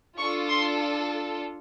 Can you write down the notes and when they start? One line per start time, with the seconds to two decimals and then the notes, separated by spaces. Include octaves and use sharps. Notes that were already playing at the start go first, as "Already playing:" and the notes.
0.19 D4 F4 A4 C#6
0.50 C6